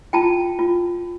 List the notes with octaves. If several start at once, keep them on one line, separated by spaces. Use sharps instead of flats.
F4 G5 A5
F4